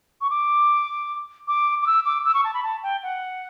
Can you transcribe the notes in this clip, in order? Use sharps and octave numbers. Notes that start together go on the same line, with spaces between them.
C#6
D6
D6
D6
E6
D6
E6
C#6
A5
B5
A5
G5
F#5